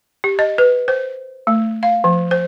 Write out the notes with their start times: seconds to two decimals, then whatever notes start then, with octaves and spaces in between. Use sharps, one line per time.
0.24 G4
0.39 D#5
0.58 B4
0.88 C5
1.47 A3
1.83 F5
2.04 F3
2.31 C5